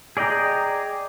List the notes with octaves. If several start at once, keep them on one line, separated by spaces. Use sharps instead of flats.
G#4 D5 D#5 G5 A#5